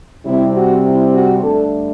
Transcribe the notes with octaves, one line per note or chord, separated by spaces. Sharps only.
C3 G3 C4 E4
F#4
E4
F#4
G2 D3 A3 D4 A4